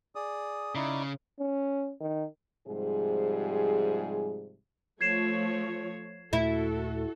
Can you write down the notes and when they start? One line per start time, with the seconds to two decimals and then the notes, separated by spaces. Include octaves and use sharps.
0.15 G#4 D5 D#6
0.75 C#3 D#4 E4 D5
1.39 C#4
2.01 D#3
2.68 G#2 C3 F3 G3 G#4
5.01 F3 A3 C#5 G#6 C7 E7
6.33 D#2 A#2 A3 E4 F#4 A4